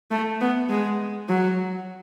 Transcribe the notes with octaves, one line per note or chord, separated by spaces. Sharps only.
A3
B3
G#3
F#3